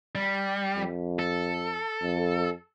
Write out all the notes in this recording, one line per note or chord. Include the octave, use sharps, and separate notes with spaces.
G3
F2
A4
F2